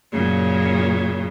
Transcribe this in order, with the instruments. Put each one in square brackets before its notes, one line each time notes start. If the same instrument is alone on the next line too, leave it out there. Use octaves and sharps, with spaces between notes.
[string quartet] F#2 A#2 C#3